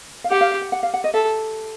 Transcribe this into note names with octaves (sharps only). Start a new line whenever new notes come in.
F5
G4 F#5
F5
F5
F#5
F#5
F5
F#5
D#5
A4 E5